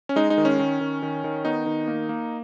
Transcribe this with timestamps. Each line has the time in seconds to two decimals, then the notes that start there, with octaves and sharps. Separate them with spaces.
0.09 C#4
0.16 G#3 D#4
0.30 D#4
0.38 D#3
0.45 C#4
0.59 D#3
0.80 D#3
1.02 D#3
1.24 D#3
1.45 B3 D#4
1.66 D#3
1.88 A#3
2.09 A#3